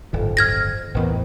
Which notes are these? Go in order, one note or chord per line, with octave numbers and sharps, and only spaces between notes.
D1 G1 F2 D#3
F6 G#6 A#6
A1 E2 A2 D#3 B3 C4